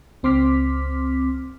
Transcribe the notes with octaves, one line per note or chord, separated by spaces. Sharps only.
C#2 C4 C6 D6 F6 B6